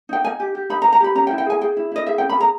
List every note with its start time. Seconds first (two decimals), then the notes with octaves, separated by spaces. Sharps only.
0.09 D#4 G5
0.24 D#4 G#5
0.40 G4
0.55 G4
0.70 D#4 B5
0.82 A#5
0.85 B4
0.93 A#5
1.00 G4 B5
1.15 C#4 A#5
1.27 G5
1.31 E4
1.38 G5
1.46 G#4 G#5
1.61 G#4 G5
1.77 E4
1.92 E4 D#5
2.07 G#4 E5
2.18 G5
2.22 C#4
2.30 B5
2.37 G#4 A#5